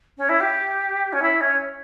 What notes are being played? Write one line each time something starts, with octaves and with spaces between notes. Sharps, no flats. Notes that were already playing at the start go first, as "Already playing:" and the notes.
C#4
E4
G4
C#4
E4
C#4